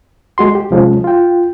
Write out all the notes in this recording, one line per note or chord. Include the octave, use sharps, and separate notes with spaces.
G#3 F#4 C6
G4
C3 F3 G#3 C#4
F4 G5